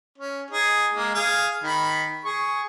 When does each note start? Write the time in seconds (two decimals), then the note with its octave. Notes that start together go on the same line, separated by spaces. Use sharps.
0.18 C#4
0.51 D#4 G#4
0.93 G#3 A#3
1.15 G#4 F5
1.63 D#3 B5
2.25 G#4 C#6